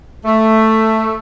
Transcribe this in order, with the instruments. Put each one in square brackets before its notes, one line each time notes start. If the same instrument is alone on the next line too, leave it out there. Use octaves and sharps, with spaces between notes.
[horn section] A3